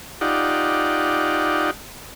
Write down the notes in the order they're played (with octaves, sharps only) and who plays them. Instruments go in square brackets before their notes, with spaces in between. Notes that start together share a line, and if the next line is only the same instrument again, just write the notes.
[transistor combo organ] D#4 F4 G4 D5 F#5